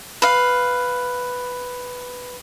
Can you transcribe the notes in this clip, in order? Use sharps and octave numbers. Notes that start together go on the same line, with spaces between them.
B4 F5